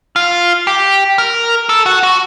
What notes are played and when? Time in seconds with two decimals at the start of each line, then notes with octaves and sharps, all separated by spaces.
0.16 F4
0.67 G4
1.18 A#4
1.69 A4
1.86 F#4
2.03 F#4